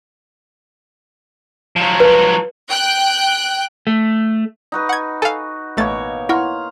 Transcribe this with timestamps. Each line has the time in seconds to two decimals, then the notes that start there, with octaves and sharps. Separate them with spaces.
1.76 F3 F#3
2.00 B4
2.70 G5 F#6
3.87 A3
4.72 D#4 F#4 B4
4.89 F#5 G#6
5.22 A4 F5 G#5
5.77 A1 B2 A3 A#3 C#5 A6
6.29 E4 F5 F#5 A#5 C6 C#6